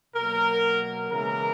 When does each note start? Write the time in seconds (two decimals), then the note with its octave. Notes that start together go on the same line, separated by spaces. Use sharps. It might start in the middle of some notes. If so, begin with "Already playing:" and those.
0.14 B2 F#3 A#3 A#4
1.10 C#3 E3 G#3 B3 A#4